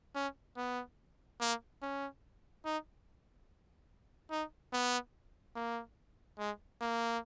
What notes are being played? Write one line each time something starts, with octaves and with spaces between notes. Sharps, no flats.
C#4
B3
A#3
C#4
D#4
D#4
B3
A#3
G#3
A#3